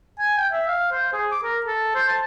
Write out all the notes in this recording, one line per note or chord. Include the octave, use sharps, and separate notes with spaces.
G#5
G5
E5
F5
C5
G#4
D6
A#4
A4
C5
A5